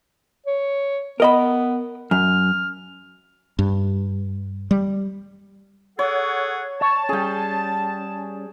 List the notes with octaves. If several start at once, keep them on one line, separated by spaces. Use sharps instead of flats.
C#5
B3 A#4 D#5 B5
F#2 F6
G2
G3
G#4 A4 C#5 F#5
C#5 A5
G3 C#4 G#4 G5